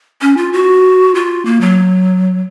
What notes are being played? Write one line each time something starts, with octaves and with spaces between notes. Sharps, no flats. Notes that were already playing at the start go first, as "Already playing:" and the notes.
C#4
F4
F#4
F4
A#3
F#3